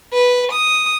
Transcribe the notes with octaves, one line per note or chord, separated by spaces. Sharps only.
B4
D#6